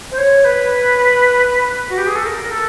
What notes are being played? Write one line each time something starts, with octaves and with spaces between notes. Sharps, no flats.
C5
C#5
B4
F#4
G4
G#4
A4
A#4
A4